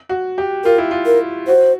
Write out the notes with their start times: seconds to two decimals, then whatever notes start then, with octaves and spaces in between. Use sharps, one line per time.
0.09 F#4
0.38 G4
0.64 F4 A#4
0.78 E4
0.91 F4
1.06 A#4
1.47 F#4 C5